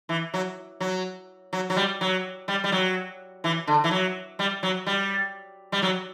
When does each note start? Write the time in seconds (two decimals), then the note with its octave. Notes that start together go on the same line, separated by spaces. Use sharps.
0.09 E3
0.34 F#3
0.80 F#3
1.53 F#3
1.70 F#3
1.76 G3
2.01 F#3
2.48 G3
2.64 G3
2.72 F#3
3.44 E3
3.67 D3
3.84 E3
3.91 F#3
4.39 G3
4.63 F#3
4.86 G3
5.72 G3
5.82 F#3